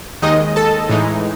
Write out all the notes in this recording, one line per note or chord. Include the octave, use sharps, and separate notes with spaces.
D#2 D#3 G#3 D#4 D#5
A4 A5
A2 E3 G#3 D#4